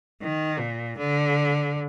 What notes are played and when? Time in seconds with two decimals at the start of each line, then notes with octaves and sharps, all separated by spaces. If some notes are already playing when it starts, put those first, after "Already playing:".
0.22 D#3
0.59 A#2
0.98 D3